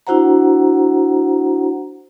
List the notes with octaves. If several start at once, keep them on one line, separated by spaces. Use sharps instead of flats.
D4 E4 F#4 C5 F#5 A#5